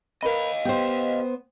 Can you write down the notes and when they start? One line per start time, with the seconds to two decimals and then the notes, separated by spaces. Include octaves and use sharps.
0.23 A#4 B4 D#5 F5 B5
0.65 B3 G4 C5